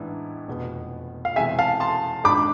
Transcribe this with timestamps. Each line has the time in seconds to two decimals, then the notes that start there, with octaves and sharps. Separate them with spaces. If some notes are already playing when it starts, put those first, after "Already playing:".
Already playing: A1 G#2 E3 B3 D4
0.48 F1 E2 B2 B3
1.25 F5
1.36 E1 E2 C3 E3 G#3 E5 G#5
1.58 F5 A5
1.80 A5 C6
2.24 G#1 G#2 G#3 D4 B5 D6